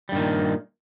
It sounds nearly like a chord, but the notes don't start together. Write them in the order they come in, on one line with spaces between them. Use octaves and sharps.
G3 G2 D#3 A#2